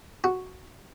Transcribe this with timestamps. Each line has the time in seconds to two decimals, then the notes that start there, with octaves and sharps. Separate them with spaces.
0.24 F#4